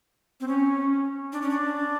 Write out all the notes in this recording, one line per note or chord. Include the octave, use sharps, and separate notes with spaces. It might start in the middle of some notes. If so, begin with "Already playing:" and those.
C4
C#4
D4
C#4
D4